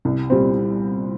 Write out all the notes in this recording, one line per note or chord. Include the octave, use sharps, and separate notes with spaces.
C2
A#2 G3 C4